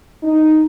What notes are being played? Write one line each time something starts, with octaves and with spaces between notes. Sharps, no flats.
D#4